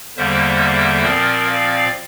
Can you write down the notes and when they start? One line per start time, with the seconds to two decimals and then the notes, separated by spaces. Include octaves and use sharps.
0.17 E2 D3 G3 A#3 C5 E5
1.03 A#2 F3 C4 A#4 D5
1.46 D5 F5